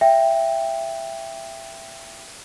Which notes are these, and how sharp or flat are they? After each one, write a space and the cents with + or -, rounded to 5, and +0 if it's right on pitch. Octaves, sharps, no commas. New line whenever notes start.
E5 +15 G5 +10